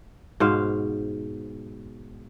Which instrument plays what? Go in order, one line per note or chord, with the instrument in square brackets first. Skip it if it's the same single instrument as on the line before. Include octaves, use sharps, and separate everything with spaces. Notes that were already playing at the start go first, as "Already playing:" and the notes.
[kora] G#2 B2 C5 F5